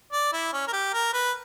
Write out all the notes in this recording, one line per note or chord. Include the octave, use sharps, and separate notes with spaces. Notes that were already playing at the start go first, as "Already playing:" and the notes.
D5
E4
C#4
A#4
G4
A#4
B4